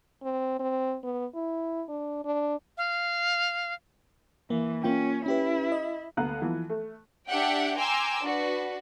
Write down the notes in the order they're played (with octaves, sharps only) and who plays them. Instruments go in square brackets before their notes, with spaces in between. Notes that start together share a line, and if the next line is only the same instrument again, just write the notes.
[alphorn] C4
C4
B3
E4
D4
D4
[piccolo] F5
[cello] E3 [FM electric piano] A#3
[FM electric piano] A#3 F4 G5 [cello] C#4
[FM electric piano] C#4 G4 B4 [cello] E4
[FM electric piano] D#5
[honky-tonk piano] D2 D3 B3 F5 A#5 F#6
E3 F3 B3
A3
[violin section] D4 G4 E5 F#5 G5
G5 G#5 A#5 C6 D6 E6
D4 F#4 B4